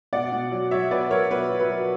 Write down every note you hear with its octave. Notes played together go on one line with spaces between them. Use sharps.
B2 D5 F#5
B2
F#3
F#3 C#5 E5
B2 B4 D5
F#3 A#4 C#5
B2 B4
F#3
B4
F#3